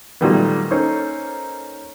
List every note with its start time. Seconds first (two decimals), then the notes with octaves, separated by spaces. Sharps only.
0.21 A#2 D#3 F#3 G3 A3 B3
0.70 A#3 C#4 D#4 A4 C5 C#5